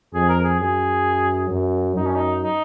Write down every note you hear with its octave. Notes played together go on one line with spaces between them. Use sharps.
F2 G#4
A#4
G#4
F#2 G#4
F#2
F#2 D#4
C#4
D#4
D#4